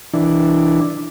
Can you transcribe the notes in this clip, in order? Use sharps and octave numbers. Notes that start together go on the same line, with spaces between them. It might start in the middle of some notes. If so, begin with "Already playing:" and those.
E3 D4